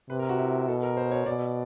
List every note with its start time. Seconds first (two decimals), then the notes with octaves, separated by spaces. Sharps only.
0.10 C3 B4
0.19 A#4
0.29 F#4
0.39 E4
0.68 B2 A4
0.83 A#4
0.97 C5
1.11 C#5
1.26 B2 D5